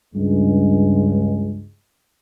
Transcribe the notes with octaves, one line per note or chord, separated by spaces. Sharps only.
C#2 G2 G#3